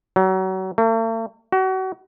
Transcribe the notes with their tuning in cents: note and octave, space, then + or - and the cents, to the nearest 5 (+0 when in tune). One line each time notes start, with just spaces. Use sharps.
F#3 +30
A3 +45
F#4 +35